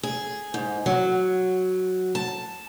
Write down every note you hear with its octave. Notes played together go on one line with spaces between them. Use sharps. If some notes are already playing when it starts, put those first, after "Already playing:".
G#4
G#2
F#3
A5